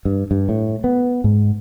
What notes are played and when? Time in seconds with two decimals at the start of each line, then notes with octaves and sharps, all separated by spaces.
0.05 G2
0.31 G2
0.49 A2
0.84 B3
1.24 G#2